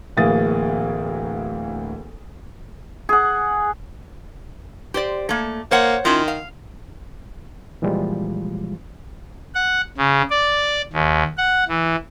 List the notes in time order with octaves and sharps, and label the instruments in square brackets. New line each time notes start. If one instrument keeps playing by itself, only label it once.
[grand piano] D1 D2 E3 A#3 D#6 A6
[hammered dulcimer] G#4 F#5
[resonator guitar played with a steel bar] G4 C5 D5
A3 A#3
[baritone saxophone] A#3 [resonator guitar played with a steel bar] C5 C#5 F#5
[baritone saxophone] D#3 [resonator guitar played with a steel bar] C#4 E4 F4
[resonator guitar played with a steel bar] F5
[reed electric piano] A#2 E3 F3 G3 G#3 F4
[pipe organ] F#5
C#3
D5
D#2
F#5
E3